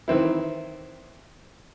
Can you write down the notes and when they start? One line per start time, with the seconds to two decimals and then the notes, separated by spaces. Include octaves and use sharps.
0.08 D#3 E3 C4 E4